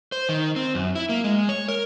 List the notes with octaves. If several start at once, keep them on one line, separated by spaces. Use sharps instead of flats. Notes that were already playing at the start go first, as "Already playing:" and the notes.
C5
D#3
C4
F#2
E4
A#3
G#3
C#5
A#4